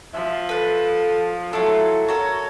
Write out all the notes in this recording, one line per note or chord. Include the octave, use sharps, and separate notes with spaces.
F3 E5
A4 B4 F#6
F#3 E4 F4 A4
F#4 A4 A#4 C#5